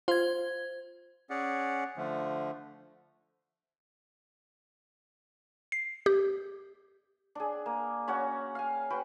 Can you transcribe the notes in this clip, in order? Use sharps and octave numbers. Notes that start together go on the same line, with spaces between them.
F4 C5 G#6
C#4 G#4 D5 F#5
D3 F3 A3
C7
G4
D4 G#4
A#3
C#4 F#4 C#5 F#5
F5 G#5
F#4 B4 G5